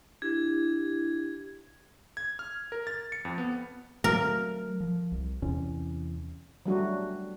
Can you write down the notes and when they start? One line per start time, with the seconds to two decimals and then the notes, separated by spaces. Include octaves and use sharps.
0.22 D4 E4 G4 G#6
2.17 G#6
2.39 F6
2.72 A#4
2.87 A6
3.12 C#7
3.25 F2
3.38 B3
4.04 F#3 A3 A#4
4.80 F3
5.12 C2
5.42 E2 C3 C#4
6.66 F#3 G3 A3 D4 F#4